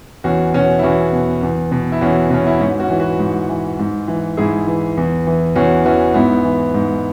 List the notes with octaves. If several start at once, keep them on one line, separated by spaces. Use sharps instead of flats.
E2 C#4 F#4
B2 C#4 F#4
E4
E2 C#4 F#4
B2
E2
B2
E4
E2 C#4 F#4
B2 C#4
E4
G#2 C#4 F#4
C#4 F#4
E3
F#4 B4
G#2
E3
G#2
E3
G#2 E4 G#4
E3
E2
E3
E2 C#4 F#4
E3 C#4 F#4
G#2 B3 E4
E3
G#2